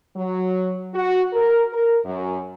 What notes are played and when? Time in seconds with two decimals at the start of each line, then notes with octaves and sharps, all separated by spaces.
0.15 F#3
0.94 F#4
1.33 A#4
1.73 A#4
2.04 F#2